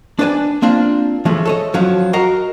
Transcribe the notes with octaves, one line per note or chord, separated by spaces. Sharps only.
D4 B4 D5 D#5 G#5
A#3 C4 D4 F4
E3 F3 G#3 A3 C#4
A4 C#5 D#5
G2 F3 F#3 C#4
F#4 A#4 D#5 F5 F#5 A#5